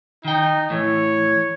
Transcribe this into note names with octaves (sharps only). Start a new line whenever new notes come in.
D#3 D#4 G5
A2 E3 C#5